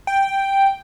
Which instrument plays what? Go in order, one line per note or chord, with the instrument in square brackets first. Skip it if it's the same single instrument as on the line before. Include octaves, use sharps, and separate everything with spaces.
[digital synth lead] G5